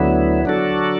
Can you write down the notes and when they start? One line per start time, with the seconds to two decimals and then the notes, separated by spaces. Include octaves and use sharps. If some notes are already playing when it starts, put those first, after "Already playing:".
Already playing: D2 D3 F#3 B3 E4
0.45 D3 F#3 D4 F#4 A4